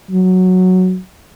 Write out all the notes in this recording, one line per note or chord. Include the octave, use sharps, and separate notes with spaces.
F#3